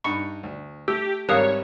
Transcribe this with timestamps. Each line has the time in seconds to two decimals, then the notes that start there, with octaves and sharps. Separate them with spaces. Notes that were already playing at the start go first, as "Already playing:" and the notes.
0.04 G2 D#4 B5 C#6 C#7
0.43 D2
0.88 A3 G4 E6
1.29 G#1 G3 A#4 C#5 F5 D#6 F#6